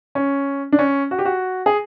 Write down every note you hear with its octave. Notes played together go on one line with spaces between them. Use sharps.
C#4
D4
C#4
F#4
G4
F#4
G#4